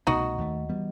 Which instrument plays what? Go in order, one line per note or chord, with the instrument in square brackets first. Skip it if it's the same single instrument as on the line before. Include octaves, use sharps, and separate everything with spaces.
[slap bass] C2 B2 A3 [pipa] D#4 F#4
[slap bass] D#2 D#3 A3
E3 G3 B3